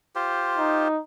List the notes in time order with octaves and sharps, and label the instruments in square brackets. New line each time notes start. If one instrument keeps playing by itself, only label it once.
[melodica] F4 G4 C5
[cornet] D#4